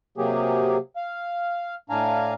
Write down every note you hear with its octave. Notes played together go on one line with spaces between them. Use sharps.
C3 F#3 A#3 G4 G#4
F5
A2 D4 F5 G#5 A#5